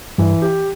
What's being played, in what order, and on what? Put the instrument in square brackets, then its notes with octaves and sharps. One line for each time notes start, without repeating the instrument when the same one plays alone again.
[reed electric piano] G2 [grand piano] E3
[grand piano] G4